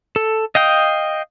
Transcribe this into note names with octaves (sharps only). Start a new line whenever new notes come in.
A4
D#5 F5 G5 D#6